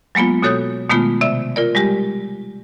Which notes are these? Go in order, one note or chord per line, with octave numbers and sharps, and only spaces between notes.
F#3 G#3 A#3 B3 F4
B2 F#4 A4 C#5 D#6 G6
B2 D#3 G#3 A3 B3 F4
C3 D5 E5
F4 A#4 D5
G3 G#3 G4